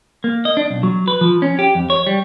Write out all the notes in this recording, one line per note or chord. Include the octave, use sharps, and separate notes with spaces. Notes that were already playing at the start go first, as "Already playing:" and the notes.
A#3
D#5
D4
B1
F#3
B4
F3
C#4
G4
F2
C#5
G3